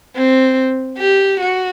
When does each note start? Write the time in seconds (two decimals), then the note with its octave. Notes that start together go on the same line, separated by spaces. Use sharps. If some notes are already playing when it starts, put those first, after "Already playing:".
0.16 C4
0.98 G4
1.40 F#4